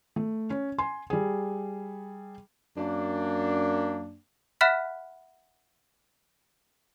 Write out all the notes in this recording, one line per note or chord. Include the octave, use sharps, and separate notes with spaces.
A3
C#4
G#5 C6
G3 G#4
F#2 A#3 D4
E5 F#5 B5 F6 F#6 B6